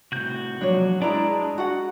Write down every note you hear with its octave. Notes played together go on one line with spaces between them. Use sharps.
A2 C3 F#4 G6
F3 F#3 G#3 A#3 D4 C#5
G#3 D4 E4 B4 D5 A#5
F#4 F#5